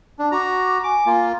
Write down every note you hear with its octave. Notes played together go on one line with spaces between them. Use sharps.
D4
F#4 A#5 D6
G#5 D6
A#3 F4